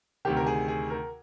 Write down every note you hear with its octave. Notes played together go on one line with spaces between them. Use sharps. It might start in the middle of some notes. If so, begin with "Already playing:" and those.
D2 C3 D#3 G4
A#4
G#4
G#4
A#4